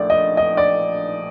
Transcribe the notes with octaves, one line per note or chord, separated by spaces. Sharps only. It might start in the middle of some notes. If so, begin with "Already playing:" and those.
Already playing: A#1 A3 D5
D#5
D#5
D5